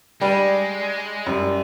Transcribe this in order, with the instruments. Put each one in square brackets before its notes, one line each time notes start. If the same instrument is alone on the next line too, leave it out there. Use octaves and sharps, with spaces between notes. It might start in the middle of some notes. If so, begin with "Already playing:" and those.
[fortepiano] G3 [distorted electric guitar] G#3 [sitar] D4
[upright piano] F#2 G3